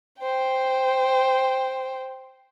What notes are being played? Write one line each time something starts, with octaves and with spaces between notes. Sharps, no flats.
C5 G5